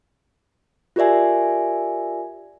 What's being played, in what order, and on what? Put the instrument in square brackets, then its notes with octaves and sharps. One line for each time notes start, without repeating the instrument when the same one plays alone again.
[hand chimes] F4 G4 A#4 D5 E5 G#5